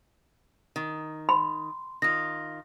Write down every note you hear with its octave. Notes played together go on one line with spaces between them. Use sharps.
D#3
B5 C6
D#3 F4 A#6